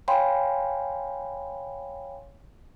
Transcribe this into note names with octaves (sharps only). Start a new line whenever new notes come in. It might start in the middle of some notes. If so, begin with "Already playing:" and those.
C#5 F5 G5 G#5 B5 C6